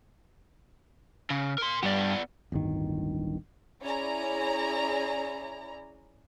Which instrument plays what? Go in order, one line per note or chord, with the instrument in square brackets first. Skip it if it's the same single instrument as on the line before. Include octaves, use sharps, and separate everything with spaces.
[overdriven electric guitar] C#3
A#4 C6
[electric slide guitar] G2 G3 G4 [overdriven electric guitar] B3 D5
[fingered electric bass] D1 G1 G2 D#3
[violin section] C#4 E4 G#4 D5 A#5